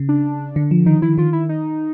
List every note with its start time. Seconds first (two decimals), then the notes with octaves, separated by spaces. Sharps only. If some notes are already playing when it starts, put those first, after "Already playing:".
Already playing: C#3
0.09 D4
0.56 D3
0.71 F3
0.86 D#3 D#4
1.02 D#3 E4
1.18 D#3 F4
1.33 E4
1.49 D#4